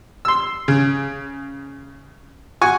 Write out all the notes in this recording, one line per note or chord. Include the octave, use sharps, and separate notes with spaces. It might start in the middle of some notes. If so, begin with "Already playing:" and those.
C6 E6
C#3
F#4 G#5 C#6